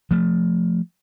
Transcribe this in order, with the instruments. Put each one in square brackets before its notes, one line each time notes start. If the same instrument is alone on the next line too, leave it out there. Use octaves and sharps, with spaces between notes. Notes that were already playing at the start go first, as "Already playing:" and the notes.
[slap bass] F3 A3